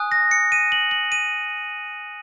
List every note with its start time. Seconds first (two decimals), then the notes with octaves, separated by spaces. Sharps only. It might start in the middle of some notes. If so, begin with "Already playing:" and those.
Already playing: G#5 D#6 F#6
0.12 A#6
0.31 C#7
0.52 D#7
0.72 F#7
0.91 F#7
1.12 D#7